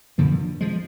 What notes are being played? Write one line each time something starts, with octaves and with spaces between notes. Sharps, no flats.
F2 D3 F3 A#3
F3 G#3